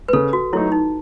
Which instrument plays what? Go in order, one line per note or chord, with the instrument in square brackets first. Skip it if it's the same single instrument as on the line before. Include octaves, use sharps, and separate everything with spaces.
[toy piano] B4
[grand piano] C#3 [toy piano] A4
[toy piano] F#4
[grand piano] F#3 A3 D#4 [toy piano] E4
[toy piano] D#4